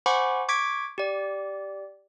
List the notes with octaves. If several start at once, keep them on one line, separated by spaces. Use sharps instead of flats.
C5 F#5 G#5 B5 C#6 D6
C#6 D6 G#6 B6 D7
G4 D5